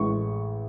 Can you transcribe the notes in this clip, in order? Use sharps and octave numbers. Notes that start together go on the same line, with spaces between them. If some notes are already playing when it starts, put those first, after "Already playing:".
Already playing: A1 A2 G#3 C#6